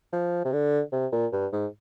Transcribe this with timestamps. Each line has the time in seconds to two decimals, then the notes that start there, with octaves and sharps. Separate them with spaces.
0.13 F3
0.45 C3
0.53 D3
0.93 C3
1.13 A#2
1.33 G2
1.53 G#2